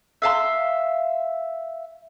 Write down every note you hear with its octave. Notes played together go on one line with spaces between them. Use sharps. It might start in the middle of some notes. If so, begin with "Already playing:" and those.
E5 F5 A5 C6